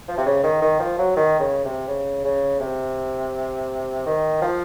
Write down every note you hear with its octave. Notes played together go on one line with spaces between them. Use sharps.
F3
C3
C#3
D#3
D#3
F3
F#3
D#3
C#3
C3
C#3
C#3
C3
D#3
F3